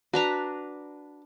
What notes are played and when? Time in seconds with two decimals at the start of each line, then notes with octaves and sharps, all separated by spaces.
0.14 D4 F#4 B4 A#5